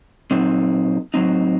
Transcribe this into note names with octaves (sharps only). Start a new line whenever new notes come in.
A#2 F#3 C4 D#4
A2 F#3 C4 D#4